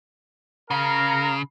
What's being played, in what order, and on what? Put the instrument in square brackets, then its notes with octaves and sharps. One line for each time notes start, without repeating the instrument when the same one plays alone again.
[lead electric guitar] C#3 [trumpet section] A#4 F5 A#5